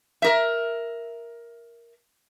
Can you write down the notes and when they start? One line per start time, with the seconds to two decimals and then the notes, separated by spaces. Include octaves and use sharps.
0.22 A#4 E5